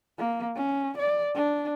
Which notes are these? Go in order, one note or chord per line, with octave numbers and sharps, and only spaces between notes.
A#3
C#4
D5
D4